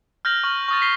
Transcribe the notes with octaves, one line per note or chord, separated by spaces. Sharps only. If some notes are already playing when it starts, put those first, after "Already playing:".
F6 G6 A#6 F7 F#7
C#6 F6 F#7
C#6 D#6 A6
B6 C7 G7